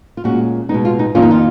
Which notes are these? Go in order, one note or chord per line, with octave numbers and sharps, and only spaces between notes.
F4
A#2 G#3 C#4 F#4
B2 G#3 B3 D#4
F4
D#4
F2 D#3 A#3 C#4 F4
D#4
F4